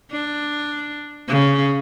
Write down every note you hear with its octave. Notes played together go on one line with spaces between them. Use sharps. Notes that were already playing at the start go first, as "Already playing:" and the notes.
D4
C#3